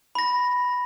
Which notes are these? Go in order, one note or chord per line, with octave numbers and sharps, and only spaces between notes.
B5 A#6